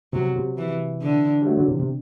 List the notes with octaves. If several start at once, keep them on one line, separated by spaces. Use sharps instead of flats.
C3 F#3
C3
E3
D3
G3
F#3 A3
D3 F#3
C3 E3
C3